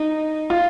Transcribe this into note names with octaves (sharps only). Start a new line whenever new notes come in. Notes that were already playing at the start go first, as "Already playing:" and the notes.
Already playing: D#4
F4